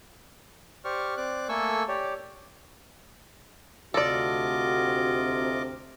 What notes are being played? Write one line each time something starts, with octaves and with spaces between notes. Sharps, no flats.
G4 C5 D5 C#6 F6
C4 D5 D6 F#6
A3 A#3 A4 G#5 C#6 E6
G4 C#5 D5
D2 C3 F4 F#4 A4 D5 D#5 D6